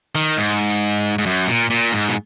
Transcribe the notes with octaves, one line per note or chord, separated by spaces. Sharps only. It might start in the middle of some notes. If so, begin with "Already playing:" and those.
D#3
G#2
G#2
F#2
A#2
A#2
G#2
B2